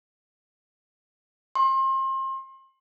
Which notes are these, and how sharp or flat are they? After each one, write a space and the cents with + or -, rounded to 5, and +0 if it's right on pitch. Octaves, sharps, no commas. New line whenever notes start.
C6 +35